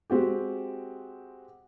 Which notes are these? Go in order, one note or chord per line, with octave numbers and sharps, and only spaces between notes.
G#3 C4 F#4 G4